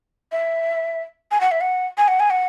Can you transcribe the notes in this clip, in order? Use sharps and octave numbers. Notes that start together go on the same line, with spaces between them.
E5
G#5
F#5
E5
F#5
G#5
F#5
G#5
F#5